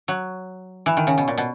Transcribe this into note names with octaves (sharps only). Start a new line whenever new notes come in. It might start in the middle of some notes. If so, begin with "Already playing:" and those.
F#3
E3
D#3
C#3
B2
A#2
B2